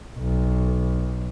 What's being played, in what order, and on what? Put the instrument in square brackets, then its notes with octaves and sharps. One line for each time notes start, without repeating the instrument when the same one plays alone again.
[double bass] B1